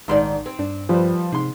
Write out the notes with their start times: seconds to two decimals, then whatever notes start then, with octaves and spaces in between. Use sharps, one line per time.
0.08 A#1 G#2 D#3 D#4 D5 C6
0.46 C4
0.59 G2 D4
0.89 F3 G3 B4 C5
1.32 G#2 C3 C6